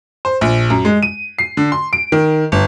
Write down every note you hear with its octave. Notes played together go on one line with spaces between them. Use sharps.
C5
A#1
F#2
G#3
D#7
C7
D3
C6
D7
D#3
G1